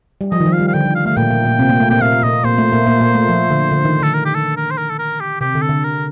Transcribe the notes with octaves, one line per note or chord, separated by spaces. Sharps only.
G3
F3 D#5
D#3
F3
F5
G3
F5
D3 G5
F3
F5
A3 F5
A#2 A#3 G5
A#2 A#3
A#2 A#3
C3 C4
A#2 A#3
A3
A#2 A#3 G5
A#2 A#3 F5
A#2 A#3 D#5
A#2 A#3 C5
A3
A#2 A#3
A#2 A#3
A#2 A#3
A3
F3
D3
D3
D#3
D3
A4
A#4
G4
A4
A#4
C5
A#4
A4
A#4
G4
C3 G4
D3
A4
D3
A#4